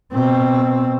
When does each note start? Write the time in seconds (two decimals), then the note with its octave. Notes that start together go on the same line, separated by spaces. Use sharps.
0.13 B2 C4